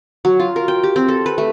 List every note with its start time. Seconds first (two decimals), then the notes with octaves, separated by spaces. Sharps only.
0.25 F#3
0.40 F4
0.56 A#4
0.68 G5
0.83 G4
0.96 C4
1.08 A4
1.26 B4
1.38 A3